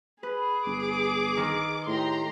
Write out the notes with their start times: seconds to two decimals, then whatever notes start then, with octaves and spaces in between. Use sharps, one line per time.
0.23 G#4 B4
0.66 G1 D6
1.37 D#3
1.87 A2 G4 A#5 C6